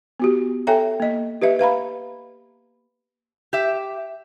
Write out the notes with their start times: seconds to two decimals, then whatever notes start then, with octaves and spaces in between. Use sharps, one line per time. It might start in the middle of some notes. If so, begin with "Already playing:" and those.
0.20 B3 F#4 G4
0.67 A4 C#5 E5 G5 G#5 A#5
1.00 A#3 D#5
1.42 G4 B4 D#5 E5
1.59 B4 F5 A#5 B5
3.53 G4 E5